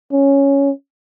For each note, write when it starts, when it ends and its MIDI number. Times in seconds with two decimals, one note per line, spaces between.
0.12 0.71 61